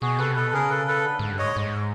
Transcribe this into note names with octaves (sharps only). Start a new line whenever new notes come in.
B2 F#4 G#4
C3 A4 B4
B2 A4 B4
C#3 G#4 A#4
A4 B4
A4 B4
D3
G#2
G2
G#2 C#5 D#5
G#2